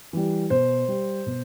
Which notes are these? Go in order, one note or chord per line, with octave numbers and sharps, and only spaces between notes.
E3 G3
B2 C5
G3
B2